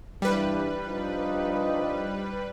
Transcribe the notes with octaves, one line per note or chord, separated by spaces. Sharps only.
G2 E3 G3 B4
G2 F3 D#4